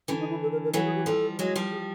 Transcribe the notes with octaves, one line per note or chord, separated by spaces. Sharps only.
D3 E3 C#4
D#4
E4
A4
A#4
A#4
E3 F#3 A4
G#4
G4
F3 G3 A4
F#3 G#3
F3 G3
G#4